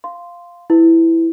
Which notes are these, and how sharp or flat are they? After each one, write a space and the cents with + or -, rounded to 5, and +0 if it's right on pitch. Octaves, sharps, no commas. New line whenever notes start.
F5 +0 C6 -5
E4 +0 B4 +25